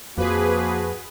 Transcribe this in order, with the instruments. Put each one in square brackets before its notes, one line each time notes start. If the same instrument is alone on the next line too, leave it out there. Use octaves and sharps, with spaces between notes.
[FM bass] F2 [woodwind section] F3 A#3 [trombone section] F#4 [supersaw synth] G#4 B4